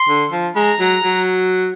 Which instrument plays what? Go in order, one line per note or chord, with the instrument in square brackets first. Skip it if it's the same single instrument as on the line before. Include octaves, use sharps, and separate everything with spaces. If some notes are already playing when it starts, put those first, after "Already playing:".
Already playing: [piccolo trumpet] C6
[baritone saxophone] D3
F3
[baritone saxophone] G#3 [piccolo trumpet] A#5
[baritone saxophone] F#3
F#3